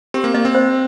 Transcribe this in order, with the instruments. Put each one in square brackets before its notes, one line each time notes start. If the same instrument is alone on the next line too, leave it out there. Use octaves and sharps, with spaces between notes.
[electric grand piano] C4 [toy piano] G4
[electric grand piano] A#3
[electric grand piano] A#3 [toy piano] D#5
[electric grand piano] C4
[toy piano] C5